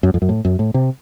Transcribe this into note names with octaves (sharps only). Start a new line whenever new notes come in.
F#2
F2
F#2
A2
F#2
A2
C3